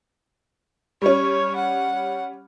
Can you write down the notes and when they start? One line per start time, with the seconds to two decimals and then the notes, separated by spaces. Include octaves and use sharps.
1.02 G3 C#4 C#5
1.56 F#5